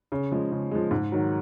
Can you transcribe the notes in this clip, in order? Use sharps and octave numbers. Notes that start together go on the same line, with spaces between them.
C#3
F3 G#3
C#3
F3 G#3
G#2
D#3 F#3